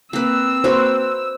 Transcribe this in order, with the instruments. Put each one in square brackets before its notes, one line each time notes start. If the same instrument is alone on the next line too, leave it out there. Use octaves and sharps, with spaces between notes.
[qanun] A#3 B4 [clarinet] C4 [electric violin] E6
[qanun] A#3 F#4 B4 [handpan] C5